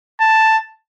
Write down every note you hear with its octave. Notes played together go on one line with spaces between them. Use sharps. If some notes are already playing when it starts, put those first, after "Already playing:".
A5